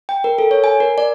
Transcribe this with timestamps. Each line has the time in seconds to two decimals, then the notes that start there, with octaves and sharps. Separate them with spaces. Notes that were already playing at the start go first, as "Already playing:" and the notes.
0.09 G5
0.24 A#4
0.38 A4
0.51 C#5
0.64 G#5
0.80 A#4
0.98 D5